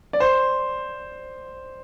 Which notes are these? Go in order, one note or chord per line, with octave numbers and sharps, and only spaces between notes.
D5
C5